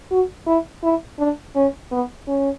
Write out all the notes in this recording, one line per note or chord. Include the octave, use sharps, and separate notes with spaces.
F#4
E4
E4
D4
C#4
B3
C#4